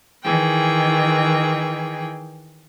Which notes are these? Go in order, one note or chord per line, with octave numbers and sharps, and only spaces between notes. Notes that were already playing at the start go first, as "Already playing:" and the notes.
D#3 E3 G#4 G5